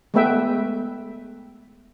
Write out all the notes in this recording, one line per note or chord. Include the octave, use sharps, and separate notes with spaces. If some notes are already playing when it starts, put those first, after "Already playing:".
G#3 A3 B3 B4 E5 G5